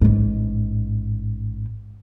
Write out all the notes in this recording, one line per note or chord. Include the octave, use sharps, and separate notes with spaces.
A1 G#2